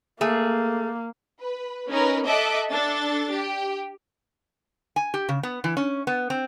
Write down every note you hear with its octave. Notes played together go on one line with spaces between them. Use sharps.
A3 A#3 G#4
B4
C#4 D#4 A#4 B4
A4 D#5 E5 A5 D6 F#6
D4 A4 A6
G4
G#5
G4
C#3
B3
E3
C#4
B3
C4